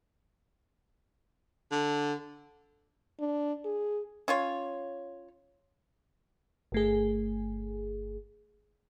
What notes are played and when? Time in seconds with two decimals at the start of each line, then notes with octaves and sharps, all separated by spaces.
1.71 D3
3.20 D4
3.65 G#4
4.28 C#4 F4 C#5
6.72 G1 A3 G#4